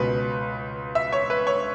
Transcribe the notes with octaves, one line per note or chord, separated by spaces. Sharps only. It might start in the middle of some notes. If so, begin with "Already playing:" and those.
Already playing: C#2 B2 B4
E5
C#5
B4
C#5